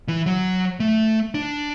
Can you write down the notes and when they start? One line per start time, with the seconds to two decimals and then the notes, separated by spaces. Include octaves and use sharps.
0.08 E3
0.26 F#3
0.80 A3
1.34 D4